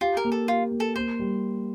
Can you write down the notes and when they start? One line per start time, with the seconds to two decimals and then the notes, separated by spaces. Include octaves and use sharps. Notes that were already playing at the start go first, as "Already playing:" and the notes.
0.01 F4 G4
0.17 A#4
0.25 A#3
0.32 A4
0.48 F4 G4
0.72 A#3
0.80 A4
0.96 A#3 C5
1.19 G3